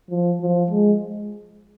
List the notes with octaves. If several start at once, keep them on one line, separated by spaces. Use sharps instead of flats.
F3
F3
G#3